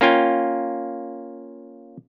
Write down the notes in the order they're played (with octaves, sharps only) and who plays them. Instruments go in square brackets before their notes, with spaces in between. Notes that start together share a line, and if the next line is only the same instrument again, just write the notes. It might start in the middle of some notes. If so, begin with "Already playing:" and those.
[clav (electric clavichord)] A#3 C#4 F4 G5